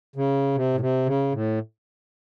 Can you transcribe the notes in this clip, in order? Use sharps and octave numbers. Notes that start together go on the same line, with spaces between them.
C#3
C3
A2
C3
C#3
A2